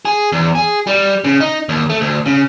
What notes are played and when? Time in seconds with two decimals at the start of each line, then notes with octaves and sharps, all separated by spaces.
0.05 G#4
0.32 E2
0.55 G#4
0.87 G3
1.24 C#3
1.41 D#4
1.69 D#2
1.90 A3
2.01 D2
2.26 C#3